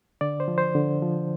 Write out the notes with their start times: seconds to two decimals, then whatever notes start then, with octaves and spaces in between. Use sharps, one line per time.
0.21 D3 D5
0.40 C5
0.48 F3
0.58 C5
0.75 D3
1.02 F3